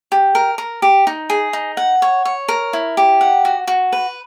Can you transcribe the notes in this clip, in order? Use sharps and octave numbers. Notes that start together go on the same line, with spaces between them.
G4
A#4
A#4
G4
D#4
G#4
D#4
F#5
C#5
C#5
A#4
E4
G4
F#5
F#4
F#4
B4